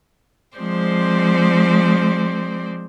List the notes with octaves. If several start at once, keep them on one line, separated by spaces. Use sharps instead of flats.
F3 G#3 C4 C5 D5